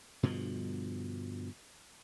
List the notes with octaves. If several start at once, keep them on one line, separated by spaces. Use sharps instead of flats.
G2 B2 D3 F3